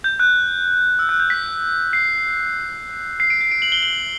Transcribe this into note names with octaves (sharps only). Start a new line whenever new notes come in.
G6
F#6
E6
F#6
G6
B6
C7
C7
D7
C7
D7
F#7
G7
F#7